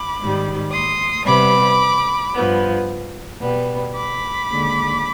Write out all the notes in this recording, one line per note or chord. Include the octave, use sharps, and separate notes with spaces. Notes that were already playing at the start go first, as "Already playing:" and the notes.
Already playing: B5 D6
G#2 D#3 G3
C6 D#6
C3 G3 B3 B5 D6
G2 F3 B3
B2 G3 B3
B5 D6
D#2 D3 G#3